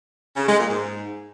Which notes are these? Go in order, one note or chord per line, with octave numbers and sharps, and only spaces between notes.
C#3
G#3
A#2
G#2